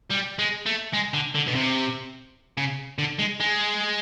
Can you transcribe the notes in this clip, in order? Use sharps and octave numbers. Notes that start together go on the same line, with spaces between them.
G3
G#3
A3
G#3
D3
D3
B2
C3
C#3
D3
G#3
G#3